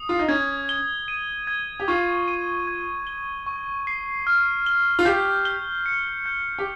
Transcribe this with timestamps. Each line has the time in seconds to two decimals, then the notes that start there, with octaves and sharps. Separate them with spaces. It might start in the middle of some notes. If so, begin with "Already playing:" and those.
Already playing: D#6
0.09 F4
0.19 D#4
0.28 C#4 G#6
0.69 G7
1.08 D#7
1.47 G#6
1.80 G4
1.88 F4 C#6
2.28 D#7
2.67 G#6
3.07 G7
3.47 C#6
3.87 C7
4.27 F6
4.66 G7
4.99 F4
5.05 G4 G6
5.45 G7
5.86 C#7
6.26 G6
6.59 G4